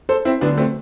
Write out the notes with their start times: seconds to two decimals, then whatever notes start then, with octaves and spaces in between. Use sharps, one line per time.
0.09 A4 C5
0.25 C4 E4
0.41 D2 D3 F#3 B3 D4
0.57 A3 C4